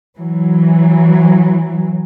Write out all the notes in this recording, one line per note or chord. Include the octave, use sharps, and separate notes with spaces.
E3 F#3